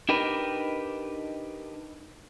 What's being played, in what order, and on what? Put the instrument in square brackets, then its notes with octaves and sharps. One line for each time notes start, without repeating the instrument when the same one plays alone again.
[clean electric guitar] D4 D#4 G4 A#4 B4